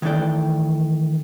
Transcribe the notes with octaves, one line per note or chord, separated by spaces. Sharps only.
D#3 E3 A3 D4 D5 G5